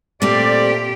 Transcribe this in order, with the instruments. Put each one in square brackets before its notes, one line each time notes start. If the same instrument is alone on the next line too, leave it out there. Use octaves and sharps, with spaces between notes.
[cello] A#2 G4 [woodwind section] G3 D5 [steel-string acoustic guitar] A3 C4